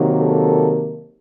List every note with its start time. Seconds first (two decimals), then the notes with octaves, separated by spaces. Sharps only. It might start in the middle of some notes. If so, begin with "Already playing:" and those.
Already playing: C3 D#3 F#3 A#3
0.18 A4